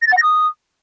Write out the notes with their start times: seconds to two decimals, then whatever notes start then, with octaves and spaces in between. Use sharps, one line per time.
0.02 A#6
0.07 A6
0.12 F#5
0.17 A#6
0.22 D#6